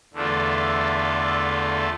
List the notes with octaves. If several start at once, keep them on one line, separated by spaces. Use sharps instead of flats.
E2 D3 A3 D4 F4